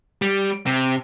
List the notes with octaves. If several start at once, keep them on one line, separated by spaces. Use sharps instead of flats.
G3
C3